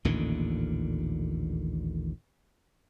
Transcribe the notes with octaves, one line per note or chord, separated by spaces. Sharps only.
A1 D#2 A#2 D3